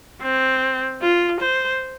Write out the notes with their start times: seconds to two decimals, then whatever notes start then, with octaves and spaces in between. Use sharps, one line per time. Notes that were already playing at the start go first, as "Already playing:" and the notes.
0.22 C4
1.02 F4
1.41 C5